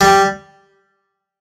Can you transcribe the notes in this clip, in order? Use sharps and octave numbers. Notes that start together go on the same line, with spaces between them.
G3